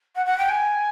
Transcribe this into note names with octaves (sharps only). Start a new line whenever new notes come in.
F#5
F#5
G5
G#5